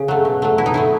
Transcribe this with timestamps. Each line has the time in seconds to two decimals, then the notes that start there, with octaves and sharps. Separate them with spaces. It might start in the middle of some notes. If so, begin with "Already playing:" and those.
Already playing: C#3
0.08 F#3 A3
0.25 B2
0.42 F#3 A3
0.58 B2 E4
0.66 D#4
0.74 F#3 A3 E4